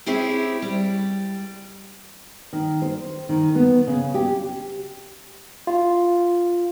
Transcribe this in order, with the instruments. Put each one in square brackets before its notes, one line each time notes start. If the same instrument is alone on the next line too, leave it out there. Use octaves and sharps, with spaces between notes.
[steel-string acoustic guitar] C4 C#4 E4 G4 G#4 C5
G3
[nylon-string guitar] D#3
C5
D#3
B3
C#3
G4
[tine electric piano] F4